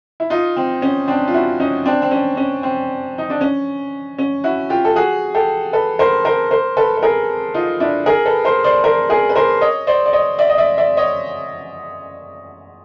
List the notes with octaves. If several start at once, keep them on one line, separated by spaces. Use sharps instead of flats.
E4
D#4 F4
C4
C#4
C4 D4
F4
E4 F#4
C#4 D#4
C4 D4
C4
C#4
C#4
C4
D#4
D4
C#4
C#4
E4 F#4
F4 G4
A4
F#4 G#4
G4 A4
A4 B4
A#4 C5
A#4 C5
A#4 C5
A4 B4
B4
G#4 A#4
D#4 F4
D4 E4
G#4 A#4
A4 B4
A#4 C5
C5 D5
A#4 C5
G#4 A#4
B4
A#4 C5
C#5 D#5
C5 D5
D5
C#5 D#5
D5 E5
D#5
D5 E5
D5 E5
C#5 D#5